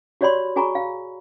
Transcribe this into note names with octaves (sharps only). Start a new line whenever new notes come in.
F#4 G4 C#5 D5 B5 C6
F#4 G#4 G#5 A#5 B5 C#6
F5